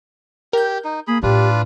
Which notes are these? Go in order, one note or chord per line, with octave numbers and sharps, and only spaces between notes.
G4 A#4 G6
D#4
A#3 G#4 B5
A2 D4 F4 G4 B4